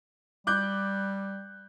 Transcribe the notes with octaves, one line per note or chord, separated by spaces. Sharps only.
G3 D6 F#6 G6